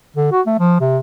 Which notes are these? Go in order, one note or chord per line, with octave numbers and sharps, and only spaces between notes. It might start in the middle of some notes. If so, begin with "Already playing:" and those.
D3
F#4
A3
F3
C3